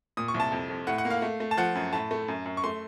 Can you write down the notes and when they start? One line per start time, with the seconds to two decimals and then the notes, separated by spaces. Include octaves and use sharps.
0.17 A#2 D#6
0.28 C#6
0.34 C2
0.40 A5
0.52 F2
0.70 F2
0.87 A2 F#5
0.98 F#5
1.05 A#3
1.10 F5
1.22 A3
1.40 A3
1.51 A5
1.57 F3 F#5
1.75 F#2
1.93 A2 A5
2.11 A3
2.28 F#2
2.46 F#2
2.57 C#6
2.64 A3 C6